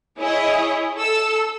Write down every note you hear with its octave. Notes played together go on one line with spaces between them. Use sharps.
E4 G#4 C#5 D#5
A4 E6